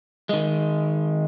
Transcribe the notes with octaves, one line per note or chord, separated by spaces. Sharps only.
D#3 G#3